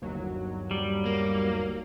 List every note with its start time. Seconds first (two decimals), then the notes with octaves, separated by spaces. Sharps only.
0.02 G1 D#2 F#3
0.71 G3
1.06 A#3